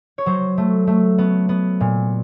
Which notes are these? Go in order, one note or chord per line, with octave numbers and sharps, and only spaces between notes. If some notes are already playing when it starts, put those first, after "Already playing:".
C#5
F#3 C5
A3
A3
B3
B3
A#2